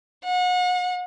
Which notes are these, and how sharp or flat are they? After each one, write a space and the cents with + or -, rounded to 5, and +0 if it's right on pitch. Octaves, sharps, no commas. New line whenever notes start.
F#5 -35